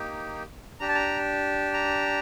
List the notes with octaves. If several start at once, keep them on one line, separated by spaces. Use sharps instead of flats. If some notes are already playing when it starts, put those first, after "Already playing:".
Already playing: A#3 D#4 G4
D4 G4 A#5
A5
A#5
A#5